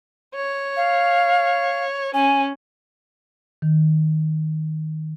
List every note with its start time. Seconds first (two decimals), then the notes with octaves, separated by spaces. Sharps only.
0.35 C#5
0.77 F5
2.14 C#4 G#5
3.62 D#3